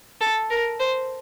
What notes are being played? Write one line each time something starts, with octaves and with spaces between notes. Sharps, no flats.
A4
A#4
C5